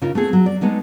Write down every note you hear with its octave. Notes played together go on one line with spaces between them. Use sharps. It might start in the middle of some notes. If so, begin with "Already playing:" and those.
C#3 C#4 D#4 F4 A#4
A3 B3 C4 G#4
F#3
D5
G#3 A3 B3 D#4